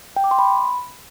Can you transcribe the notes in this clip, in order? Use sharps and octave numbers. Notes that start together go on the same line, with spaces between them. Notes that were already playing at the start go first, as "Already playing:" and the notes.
G5
D6
C6
B5